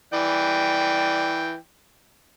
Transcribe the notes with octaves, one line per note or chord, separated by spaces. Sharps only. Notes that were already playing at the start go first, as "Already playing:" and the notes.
E3 D5 G5